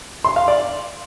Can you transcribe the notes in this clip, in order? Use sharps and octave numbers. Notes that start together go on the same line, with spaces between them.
C6
F5
D5